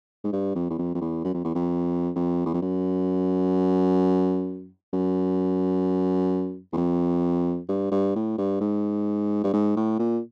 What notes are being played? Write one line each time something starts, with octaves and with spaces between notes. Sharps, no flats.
G#2
G2
F2
E2
F2
F2
E2
F#2
F2
E2
F2
F2
E2
F2
F#2
F#2
E2
F2
G2
G2
A2
G2
G#2
G2
G#2
A2
A#2